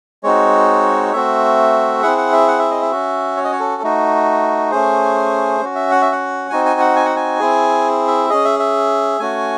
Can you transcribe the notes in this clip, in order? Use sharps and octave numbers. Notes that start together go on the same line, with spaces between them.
G#3 C4 D#4 F#4 C#5
A3 C4 F#4 E5
C4 E4 G#4 F#5
F#5
E5
F#5
E5
D#5
E5
C#4 F#4
C#5
D#5
C#5
A4
A3 D#4 F#4
A3 C#4 G#4 C5
C#4 F#4
E5
F#5
E5
F#5
C4 D#4 F#4 G#5
G#5
F#5
G#5
F#5
G#5
C4 E4 G#4
E5
C#4 G#4 D#5
E5
E5
A3 C#4 F#4 G#5